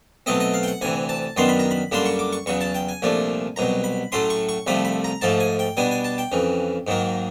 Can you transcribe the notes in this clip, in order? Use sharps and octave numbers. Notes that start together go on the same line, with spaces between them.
B2 F#3 A3 C4 D#5
D#5
F5
G5
F#5
D2 C3 E3 G#5
A5
F#2 D#3 F#3 B3 D4 C6
B5
A#5
B5
F#2 D3 G3 A#3 D4 C6
C#6
D6
C#6
E2 C#3 F#3 C#6
A5
G5
G#5
C2 A#2 F3 A3 D4
C2 B2 F#3 A#5
B5
A2 F#3 A3 C#4 C6
C#6
C#6
C2 C3 F3 A3 B5
B5
A#5
G#2 F3 A3 A5
G#5
G5
B2 G3 B3 D4 G#5
G#5
A5
G5
F2 C#3 E3
G#2 D#3 F#3 A#3